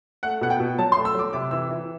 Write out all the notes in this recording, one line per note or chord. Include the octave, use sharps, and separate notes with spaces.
A3 F#5
B2 F#5
G5
B2
F#3 A5
C6
A3
E6
F#3 D6
C3 D6
E3 E6
E3